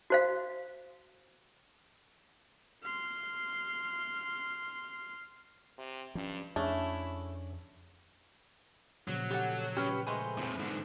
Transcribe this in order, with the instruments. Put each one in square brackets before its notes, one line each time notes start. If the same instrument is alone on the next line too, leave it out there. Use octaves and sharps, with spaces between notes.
[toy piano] F#4 C5 F5
[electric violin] C6 F6
[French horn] C3
[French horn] G2 [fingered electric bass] F3 C#4
[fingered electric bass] F2 [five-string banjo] A3 [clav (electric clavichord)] C#4 D4 G#4 [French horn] E4
[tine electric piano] A#2 C#3 F3 [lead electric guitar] F#3
[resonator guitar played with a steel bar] G4 A4 F#5
[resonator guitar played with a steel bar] C#4 [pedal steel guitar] G4 B4 G5
[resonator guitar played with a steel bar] G#3 A3 [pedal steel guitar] B4 C5 G#5
[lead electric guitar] F2 A2
G#2 D3